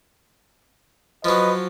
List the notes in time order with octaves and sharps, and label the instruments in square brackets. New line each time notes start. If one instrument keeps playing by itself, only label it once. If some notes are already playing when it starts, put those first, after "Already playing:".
[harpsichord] F3 F#3 [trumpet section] B4 D#5